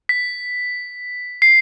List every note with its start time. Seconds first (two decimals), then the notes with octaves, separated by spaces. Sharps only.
0.09 B6
1.42 C7